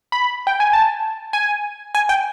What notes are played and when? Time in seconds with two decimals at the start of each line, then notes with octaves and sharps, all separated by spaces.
0.12 B5
0.47 G5
0.60 G#5
0.73 A5
1.33 G#5
1.95 G#5
2.09 G5